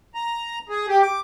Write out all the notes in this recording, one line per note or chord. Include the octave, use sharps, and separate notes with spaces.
A#5
G#4
G4
D6